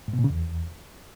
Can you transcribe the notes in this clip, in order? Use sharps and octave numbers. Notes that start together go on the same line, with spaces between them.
G#2
B2
A#2
C#3
E2